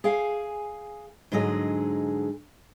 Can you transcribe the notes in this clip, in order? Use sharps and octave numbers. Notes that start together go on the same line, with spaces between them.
G#4 F5 G5 G#5
G#2 D3 F#3 G#4 D#5